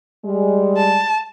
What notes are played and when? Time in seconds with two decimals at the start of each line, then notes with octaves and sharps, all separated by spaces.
0.25 G3 G#3
0.77 A5